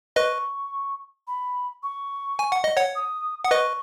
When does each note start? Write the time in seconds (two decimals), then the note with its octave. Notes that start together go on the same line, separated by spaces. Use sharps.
0.16 B4 D#5 C#6
1.28 B5
1.83 C#6
2.39 G#5
2.52 F#5
2.64 D#5
2.77 C#5 F#5
2.96 D#6
3.44 F#5 D#6
3.51 B4 D#5 C#6